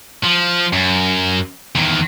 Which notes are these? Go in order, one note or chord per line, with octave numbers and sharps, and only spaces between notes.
F3
F#2
E2 D#3